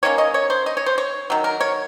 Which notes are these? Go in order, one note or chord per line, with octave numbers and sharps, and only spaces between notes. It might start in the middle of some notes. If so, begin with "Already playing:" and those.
D#3 A#3 C#4 C#5
D#5
C#5
C5
D#5
C#5
C5
C#5
D#3 F#3
A#4
C#5